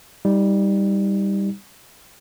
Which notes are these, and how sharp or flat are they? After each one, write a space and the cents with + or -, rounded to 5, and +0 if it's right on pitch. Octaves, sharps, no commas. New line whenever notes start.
G3 +10 D#4 +25